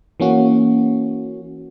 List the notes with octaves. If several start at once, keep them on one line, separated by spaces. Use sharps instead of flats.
E3 A#3 C#4 F#4